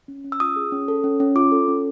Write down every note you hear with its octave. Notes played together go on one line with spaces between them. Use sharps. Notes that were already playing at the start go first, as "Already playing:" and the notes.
C#4
C#4
E6
F4 D#6
G#4
C#4
A4
C#4
C#4
F4 D6
A4
C#4